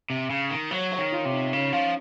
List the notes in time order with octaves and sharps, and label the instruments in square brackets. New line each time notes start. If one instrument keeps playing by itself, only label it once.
[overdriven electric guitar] C3
C#3
D#3
[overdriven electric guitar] F#3 [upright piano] C#5
[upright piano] C#5
[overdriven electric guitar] D#3
[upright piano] F4
[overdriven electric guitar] C3
[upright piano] D#4
[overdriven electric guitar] C#3 [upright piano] C#4
[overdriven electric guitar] F3 [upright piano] C#4